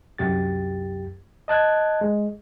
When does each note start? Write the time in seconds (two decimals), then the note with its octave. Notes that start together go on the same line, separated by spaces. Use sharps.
0.18 C2 F#2 G4 A6
1.48 D#5 A5 F#6 G#6
2.01 G#3